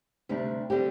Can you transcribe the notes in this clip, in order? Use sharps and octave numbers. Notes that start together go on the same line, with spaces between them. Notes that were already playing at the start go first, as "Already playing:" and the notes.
D2 C3 G3 D4
D3 G3 C4 G4